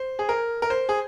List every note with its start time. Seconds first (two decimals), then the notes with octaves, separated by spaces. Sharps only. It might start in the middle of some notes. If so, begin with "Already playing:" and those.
Already playing: C5
0.19 G#4
0.29 A#4
0.62 A#4
0.70 C5
0.89 G#4